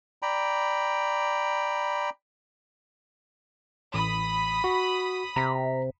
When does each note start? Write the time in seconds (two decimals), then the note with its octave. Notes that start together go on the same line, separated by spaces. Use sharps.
0.22 D5 G5 A#5 B5
3.94 A1 B5 D#6
4.64 F#4
5.36 C3 A#5 B6